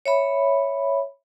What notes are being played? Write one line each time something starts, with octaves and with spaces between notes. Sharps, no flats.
C#5 E5 B5